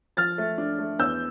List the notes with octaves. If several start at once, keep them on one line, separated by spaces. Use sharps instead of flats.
F3 F6 A6
A3
D4
A3
E2 E6 G6